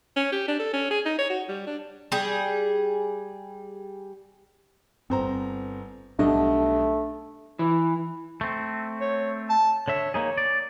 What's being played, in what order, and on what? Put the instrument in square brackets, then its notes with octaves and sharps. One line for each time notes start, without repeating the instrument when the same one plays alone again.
[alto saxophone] C#4
G4
D4
A4
C#4
G#4
D#4
C#5
F#4
G3
D4
[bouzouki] G3 G#4
[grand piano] G1 C5 A#5 [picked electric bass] C4
[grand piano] B1 G3 D#5 [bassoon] A3 [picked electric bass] D4
[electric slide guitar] E3
[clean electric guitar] A3 C4
[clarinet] C#5
A5
[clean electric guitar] D3 E5 [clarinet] C#5
[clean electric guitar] A#3 D#4 G#4 [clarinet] C#5
[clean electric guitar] D5